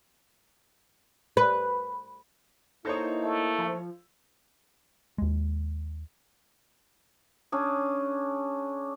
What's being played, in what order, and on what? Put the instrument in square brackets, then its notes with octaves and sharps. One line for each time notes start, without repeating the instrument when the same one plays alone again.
[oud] B4
[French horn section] A#3 E4 [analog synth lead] D#4 [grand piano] A4 C5 C#5
[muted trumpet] A3
[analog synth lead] F3
[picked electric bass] D#2 G#3
[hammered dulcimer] C#4 D4 G#4